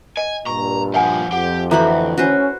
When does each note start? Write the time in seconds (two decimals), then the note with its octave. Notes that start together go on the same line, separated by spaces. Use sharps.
0.17 D#5 G#5
0.46 G2 A#2 A#5 C#6
0.94 F3 G3 E5 F#5 G#5
1.32 F2 G4 F#5
1.71 D2 E3 F#4 A4 A#5 B5
2.18 C#4 F#4 B4 C5